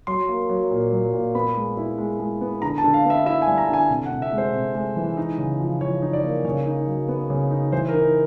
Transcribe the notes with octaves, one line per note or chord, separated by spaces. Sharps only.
F#3 C6
A#3
F#3
A#2
F#3
A#2
B3 B5
G#3
E4
G#3
G#3
B3
D3 A#5
A5
D3
F5
B3
E5
E4 E5
G#5
G3
A#5
D3 G#5
C3
F#5
C3
E5
G#3
C5
C3
G#3
E3
D#4
C#3
F3
F3 C#5
D#4
D5
A#3
C#3 C#5
D#4
F#3
B3
C#3
D#4
E3 C5
A#4
D#4